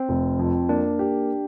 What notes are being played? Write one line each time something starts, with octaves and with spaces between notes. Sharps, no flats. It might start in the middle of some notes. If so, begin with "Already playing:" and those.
Already playing: C4
F1
F2
A#3 D4
G4